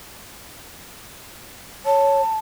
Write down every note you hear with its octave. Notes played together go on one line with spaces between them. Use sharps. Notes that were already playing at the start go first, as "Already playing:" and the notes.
C#5 A5